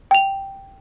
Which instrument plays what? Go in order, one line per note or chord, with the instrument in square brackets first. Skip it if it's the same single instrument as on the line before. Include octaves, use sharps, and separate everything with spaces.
[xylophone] G5 F7